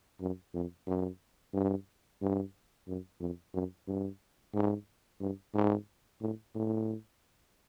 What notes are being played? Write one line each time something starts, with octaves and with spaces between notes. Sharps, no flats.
F#2
F2
F#2
G2
G2
F#2
F2
F#2
G2
G#2
G2
G#2
A2
A2